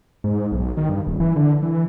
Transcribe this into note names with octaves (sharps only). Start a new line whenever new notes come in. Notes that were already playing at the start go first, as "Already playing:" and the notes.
G#2
B1
D#3
G2
D#1
E3
D3
E3